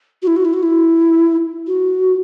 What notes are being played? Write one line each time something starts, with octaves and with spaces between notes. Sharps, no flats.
F#4
E4
F#4
E4
F#4
E4
F#4